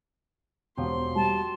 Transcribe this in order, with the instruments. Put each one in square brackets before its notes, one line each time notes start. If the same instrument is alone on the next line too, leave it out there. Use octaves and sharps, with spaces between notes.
[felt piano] E1 [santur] F3 F#3 G4 [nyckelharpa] C6
[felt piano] G3 [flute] A5